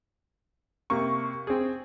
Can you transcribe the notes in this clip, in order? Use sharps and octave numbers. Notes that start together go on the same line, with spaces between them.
C3 A#3 C#6
C4 G#4